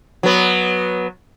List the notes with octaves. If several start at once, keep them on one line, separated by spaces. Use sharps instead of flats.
F#3 B3